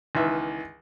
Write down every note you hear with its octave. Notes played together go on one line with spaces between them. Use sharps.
C#2 D#3 E3 E5